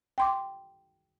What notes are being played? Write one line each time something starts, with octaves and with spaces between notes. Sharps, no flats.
G5 C6 D6